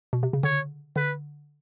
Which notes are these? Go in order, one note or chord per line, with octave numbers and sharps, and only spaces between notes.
B2
C3
C#3
D3 C#5
D3 B4